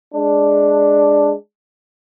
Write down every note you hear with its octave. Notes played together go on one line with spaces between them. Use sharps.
G#3 D4